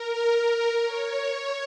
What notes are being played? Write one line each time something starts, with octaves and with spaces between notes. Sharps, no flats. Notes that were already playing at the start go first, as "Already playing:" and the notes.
Already playing: A#4
A#4
C#5